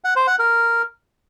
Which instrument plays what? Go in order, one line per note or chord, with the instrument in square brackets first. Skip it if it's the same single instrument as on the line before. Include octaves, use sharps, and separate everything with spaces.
[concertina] F#5
C5
F#5
A#4